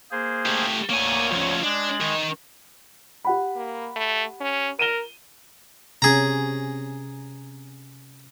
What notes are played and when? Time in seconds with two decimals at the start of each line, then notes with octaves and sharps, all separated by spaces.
0.11 A#3 G#4 C5
0.46 A3 G4
0.90 D2 A#3 C#5 G#5
1.32 F3 C#4
1.64 G#3 D4
2.01 D#3
3.25 G4 F#5 B5
3.56 A#3
3.96 A3
4.41 C#4
4.79 A#4 D#7 E7 G7
6.02 C3 C#4 G#4 A#5